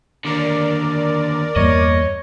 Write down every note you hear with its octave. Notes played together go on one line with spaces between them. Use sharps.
D#2 D3 A#4 D5
E2 G2 A#3 C#5 D#5